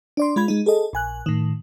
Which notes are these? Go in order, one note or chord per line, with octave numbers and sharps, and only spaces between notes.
D4 D5 C6
G#3 F4 B5 G#6
G#3 D#4
G#4 A4 D#5
A#1 G#5 F#6
A2 D#3